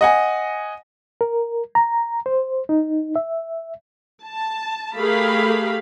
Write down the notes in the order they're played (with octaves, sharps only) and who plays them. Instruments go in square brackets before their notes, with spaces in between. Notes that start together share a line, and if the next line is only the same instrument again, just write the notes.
[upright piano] D#5 F#5 G#5
[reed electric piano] A#4
A#5
C5
D#4
E5
[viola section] A5
A3 G4 G#4 A#4 F5 B5